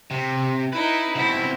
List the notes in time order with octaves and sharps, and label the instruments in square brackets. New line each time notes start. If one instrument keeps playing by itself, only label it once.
[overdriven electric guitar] C3
[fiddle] D#4 E4 [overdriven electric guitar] B4
[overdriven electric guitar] B2 C4 [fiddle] E4